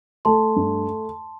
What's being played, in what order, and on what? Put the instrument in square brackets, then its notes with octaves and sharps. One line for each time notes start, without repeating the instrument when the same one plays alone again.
[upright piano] A3 [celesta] A5 C6
[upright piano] G2